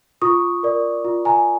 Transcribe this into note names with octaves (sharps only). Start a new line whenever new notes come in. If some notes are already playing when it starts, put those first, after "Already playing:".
F4 C#6 D#6
A#4 D5
F4
G#5 A#5